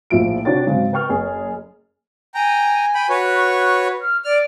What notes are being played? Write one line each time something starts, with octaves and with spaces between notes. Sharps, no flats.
A#1 A2 F3 E4 D7
C3 D4 F#4 C#5 G5 A6
G#2 C#3 F#3 C4
B4 G5 C#6 F6
F#1 G#4
G5 G#5 A#5
G5 B5
F#4 B4 C#5
C#6
F6
D5 F6